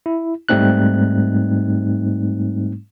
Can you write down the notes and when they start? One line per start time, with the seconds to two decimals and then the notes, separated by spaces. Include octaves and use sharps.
0.06 E4
0.49 G#2 G3 A3 C4 D#4 F#6